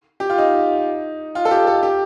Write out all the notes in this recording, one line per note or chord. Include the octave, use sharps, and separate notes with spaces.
G4
F4
D#4
F4
A4
G4
A4
G4